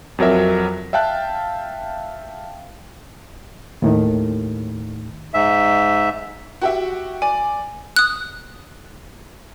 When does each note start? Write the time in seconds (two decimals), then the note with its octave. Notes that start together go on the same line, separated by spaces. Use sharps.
0.18 F2 F#3 A#4 E5
0.93 E5 F5 G5 A5 F#6
3.82 D#2 A2 D#3
5.34 G#2 E5
6.62 F#4 G4 E5
7.22 D5 G#5
7.96 D#6 F#6